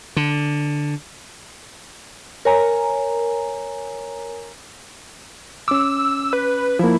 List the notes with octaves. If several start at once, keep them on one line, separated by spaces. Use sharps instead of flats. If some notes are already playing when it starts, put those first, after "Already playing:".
D3
A#4 C#5 G#5 A#5
C#4 D6 E6
B4
F3 A#3 E4